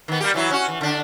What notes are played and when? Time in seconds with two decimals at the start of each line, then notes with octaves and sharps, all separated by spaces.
0.08 D#3 B3
0.20 G3 A#3 G4
0.34 E3 F#3 E4
0.51 C#4 F#4
0.68 E3
0.81 D3 D4